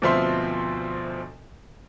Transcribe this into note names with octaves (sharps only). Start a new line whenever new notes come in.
D2 B2 F3 C4 E5 C6